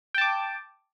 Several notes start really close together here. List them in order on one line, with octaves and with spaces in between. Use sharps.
G5 A5 D6